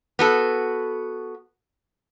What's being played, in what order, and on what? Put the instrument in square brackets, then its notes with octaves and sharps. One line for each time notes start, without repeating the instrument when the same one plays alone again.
[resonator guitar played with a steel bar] B3 F#4 A4